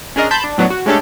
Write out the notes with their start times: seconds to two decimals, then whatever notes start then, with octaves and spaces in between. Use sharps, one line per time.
0.16 C#4 D4 G#4 A#4 D#5
0.31 A5 B5 C6 G6
0.44 D4
0.58 A2 F#3 B3 D4
0.70 F#4
0.86 G#3 A3 C#4 D4 G4 A4